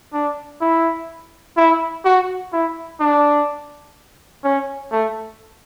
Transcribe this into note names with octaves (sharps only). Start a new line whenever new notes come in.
D4
E4
E4
F#4
E4
D4
C#4
A3